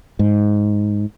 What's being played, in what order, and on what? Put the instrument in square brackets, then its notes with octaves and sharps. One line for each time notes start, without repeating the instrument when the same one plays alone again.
[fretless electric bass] G#2